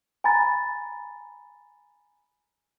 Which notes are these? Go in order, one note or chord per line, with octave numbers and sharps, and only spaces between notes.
G#5 A#5 B5 A6